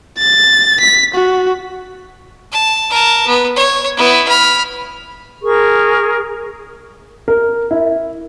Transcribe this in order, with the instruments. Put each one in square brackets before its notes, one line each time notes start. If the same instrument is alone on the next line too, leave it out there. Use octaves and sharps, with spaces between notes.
[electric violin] A6
B6
F#4
[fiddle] A5
A#4 A5
B3
C#5
B3 E4
B5 F6
[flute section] G#4 A#4 C#6
[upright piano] A#4
E4